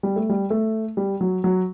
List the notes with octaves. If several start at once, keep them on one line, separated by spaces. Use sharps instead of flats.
G3
A3
G3
A3
G3
F#3
F#3